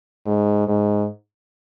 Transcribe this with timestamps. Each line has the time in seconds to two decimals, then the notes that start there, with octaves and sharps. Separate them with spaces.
0.26 G#2
0.68 G#2